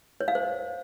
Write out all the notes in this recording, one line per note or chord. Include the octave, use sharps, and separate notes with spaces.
C#5
F5
C5